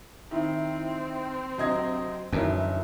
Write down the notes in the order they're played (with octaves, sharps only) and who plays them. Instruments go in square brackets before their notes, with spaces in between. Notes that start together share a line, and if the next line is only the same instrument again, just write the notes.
[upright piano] D#3 [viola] C4 [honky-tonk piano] E4
[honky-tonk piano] D2 C3 [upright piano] F#3 D#5 G#6
[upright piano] G1 [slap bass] F#2 [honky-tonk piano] E3 D#4 E4